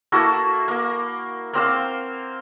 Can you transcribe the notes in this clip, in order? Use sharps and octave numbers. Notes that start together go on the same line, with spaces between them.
A#3 E4 F#4 A4
A#3
A#3 C4 C5 F5